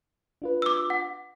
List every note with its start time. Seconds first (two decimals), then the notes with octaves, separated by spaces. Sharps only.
0.42 D4 F4 B4
0.62 D6 E6
0.90 F#5